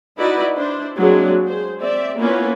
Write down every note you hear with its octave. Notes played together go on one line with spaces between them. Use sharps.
D#4 E4 F#4 B4 D5 D#5
D4 E4 C5
F#3 G#3 A#3 C4 D4 G#4
G#4 C5
C4 D5 E5
A#3 B3 C#4 E4 F4 B4